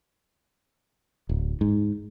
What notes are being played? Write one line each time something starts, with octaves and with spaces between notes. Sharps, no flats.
D1
G#2